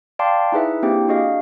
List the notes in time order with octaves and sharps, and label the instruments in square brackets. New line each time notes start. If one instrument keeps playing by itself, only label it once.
[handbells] D5 F5 G5 A5 C6 D6
D#4 E4 G#4 B4 E5
A#3 C4 D4 E4 G4 G5
D4 F#4 G#4 D#5 F5